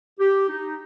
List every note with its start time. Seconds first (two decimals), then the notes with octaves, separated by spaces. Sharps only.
0.19 G4
0.49 D#4